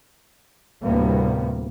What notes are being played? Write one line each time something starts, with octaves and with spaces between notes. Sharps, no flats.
D2 A2 C3 G3 A#3 B3